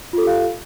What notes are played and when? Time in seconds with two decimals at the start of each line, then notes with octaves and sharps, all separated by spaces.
0.13 F4
0.18 A4
0.22 G4
0.27 F5